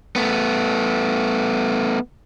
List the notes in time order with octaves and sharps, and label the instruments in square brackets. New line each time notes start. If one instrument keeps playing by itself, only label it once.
[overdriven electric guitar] A3 B3